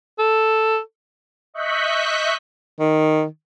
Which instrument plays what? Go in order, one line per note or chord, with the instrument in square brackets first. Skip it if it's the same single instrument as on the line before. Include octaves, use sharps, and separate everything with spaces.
[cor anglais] A4
[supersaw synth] D#5 E5 C#6 F#6 G6 B6
[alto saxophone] D#3